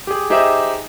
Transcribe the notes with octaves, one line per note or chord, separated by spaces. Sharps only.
G4 G#4
D#4 G4 G#4 C5 D#5 E5